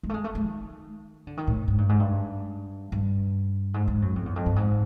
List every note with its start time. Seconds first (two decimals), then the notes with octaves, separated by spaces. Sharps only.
0.03 G#3
0.09 A3
0.14 G#3
0.24 A3
0.35 A3
0.45 D#3
1.27 D3
1.37 D#3
1.47 A2
1.68 G#2
1.78 G2
1.89 G#2
2.00 G2
2.92 G2
3.74 G#2
3.88 G#2
4.02 F#2
4.16 F2
4.26 E2
4.36 F2
4.46 G2
4.56 G#2